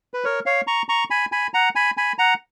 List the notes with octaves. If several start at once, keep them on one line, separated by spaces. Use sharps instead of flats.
B4
A#4 C#5
C#5 F5
A#5 C#6
A#5 C#6
G#5 B5
G#5 B5
F#5 A#5
G#5 B5
G#5 B5
F#5 A#5